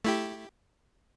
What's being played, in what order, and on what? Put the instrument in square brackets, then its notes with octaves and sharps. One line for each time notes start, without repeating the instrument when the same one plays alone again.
[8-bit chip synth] A3 E4 G4